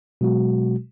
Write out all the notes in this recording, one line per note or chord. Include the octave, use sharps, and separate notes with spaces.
B2 F#3 G#3 F#4